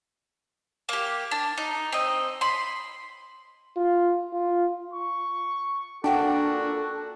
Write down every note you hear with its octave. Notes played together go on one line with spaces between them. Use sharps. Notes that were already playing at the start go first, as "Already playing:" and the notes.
A#3 G4
D4
D#4
C4 D#5
B5 C6
F4
F4
C#6
A#2 D4 F#4 A4 F#5 G5